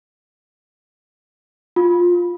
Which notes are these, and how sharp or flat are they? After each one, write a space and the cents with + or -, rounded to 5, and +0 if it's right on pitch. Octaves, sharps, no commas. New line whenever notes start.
F4 +10